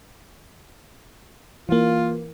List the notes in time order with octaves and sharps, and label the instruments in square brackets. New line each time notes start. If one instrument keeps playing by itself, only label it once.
[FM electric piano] E3 A#3 [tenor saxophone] F4